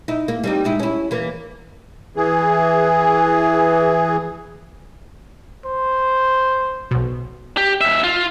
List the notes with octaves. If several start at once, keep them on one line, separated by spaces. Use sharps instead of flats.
D#4 E4
A#3
G3 C4 D#4
G#2 D#4 E4
C#4 E4
E3 A#3
E3 G#4
C5
B1 B2
G4
D#2 E5
F4